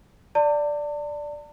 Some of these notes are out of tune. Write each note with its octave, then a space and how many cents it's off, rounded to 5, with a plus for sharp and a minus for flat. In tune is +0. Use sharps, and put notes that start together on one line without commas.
D5 +0 A5 +40